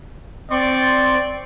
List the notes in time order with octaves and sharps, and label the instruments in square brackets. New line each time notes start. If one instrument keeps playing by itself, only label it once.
[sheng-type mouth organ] C4 C6 C#6 [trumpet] D5